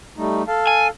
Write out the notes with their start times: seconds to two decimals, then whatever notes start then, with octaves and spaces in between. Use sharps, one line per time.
0.17 G3 A3 D#4
0.48 A4 F5 A5
0.67 G#5